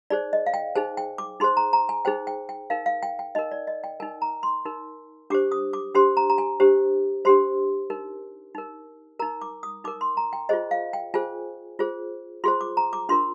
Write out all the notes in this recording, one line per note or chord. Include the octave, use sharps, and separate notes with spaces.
D#4 G#4 C5 D5
D#5
F5
G5
D#4 G#4 C5 G#5
G5
D6
D#4 G#4 C5 C6
A#5
A#5
G#5
D#4 G#4 C5 G5
G5
G5
D#4 A#4 F5
F5
G5
G5
D#4 A#4 D#5
D5
D#5
G5
D#4 A#4 G#5
A#5
C6
D#4 A#4
D4 G4 C5 D6
D#6
D6
D4 G4 C5 C6
A#5
A#5
G#5
D4 G4 C5
D4 G4 C5 C6
D#4 A#4
D#4 A#4
D#4 A#4 A#5
D6
D#6
D#4 A#4 D6
C6
A#5
G5
F4 G#4 C5 D#5
F5
G5
F4 G#4 C5 G#5
F4 G#4 C5
F4 G#4 C5 C6
D6
A#5
D6
D4 F4 A#4 C6